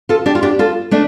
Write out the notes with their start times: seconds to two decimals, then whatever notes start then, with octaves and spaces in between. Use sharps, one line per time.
0.09 F4 A4
0.26 D4 G4
0.35 F4
0.43 D4 G4
0.59 F4 A4
0.91 A3 D4